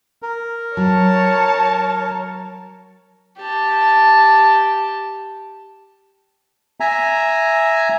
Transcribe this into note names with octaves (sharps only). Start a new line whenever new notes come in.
A#4
F#3 C#5 A5
G4 A5
E5 G#5 A#5